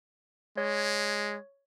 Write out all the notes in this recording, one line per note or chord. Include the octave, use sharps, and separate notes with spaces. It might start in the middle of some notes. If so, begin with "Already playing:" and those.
G#3 C#5